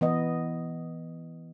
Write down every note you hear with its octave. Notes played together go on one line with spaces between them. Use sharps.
E3 B3 D#5